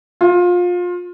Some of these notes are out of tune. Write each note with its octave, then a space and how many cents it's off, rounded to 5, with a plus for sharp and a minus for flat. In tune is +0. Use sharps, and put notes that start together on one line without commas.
F4 +25